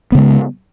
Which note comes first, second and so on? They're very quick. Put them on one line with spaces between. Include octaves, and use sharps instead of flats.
B3 C#3 G#3